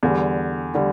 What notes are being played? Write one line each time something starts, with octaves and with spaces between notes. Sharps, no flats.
E2 D3 G3
D3 G3